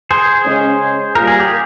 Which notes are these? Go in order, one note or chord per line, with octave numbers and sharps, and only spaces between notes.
G#4 C5
C#3 G#3 C#4
G3 A#3 F4 A#4
G#4
G4